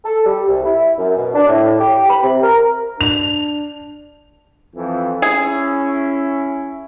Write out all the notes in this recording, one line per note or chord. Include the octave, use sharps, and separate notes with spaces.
A4
G3
C2
E4
F#2
B2
D4
A2
G4
B5
C3
A#4
D4 F7
F2 E3 F3
C#4 E4 G#4